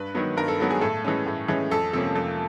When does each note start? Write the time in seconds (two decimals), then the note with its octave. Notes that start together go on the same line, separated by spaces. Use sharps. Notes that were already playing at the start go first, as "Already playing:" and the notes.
Already playing: G2 B4
0.15 D#3 F#3 B3
0.37 G2 A#4
0.48 A4
0.60 D#3 F#3 B3 A4
0.71 G#4
0.81 A2 A4
1.04 E3 G#3 C#4
1.26 A2
1.48 E3 G#3 C#4
1.71 F2 A4
1.93 C3 F3 A#3 C#4 A4
2.15 F2 A4